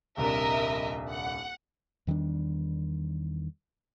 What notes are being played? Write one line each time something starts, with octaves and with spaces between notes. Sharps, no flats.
D#1 C2 D4 A#4 D#5 E5
F#5
E2 D#3 G3 D4